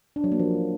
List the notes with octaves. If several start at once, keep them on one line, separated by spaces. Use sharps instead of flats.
D4
F#3
A#3
F3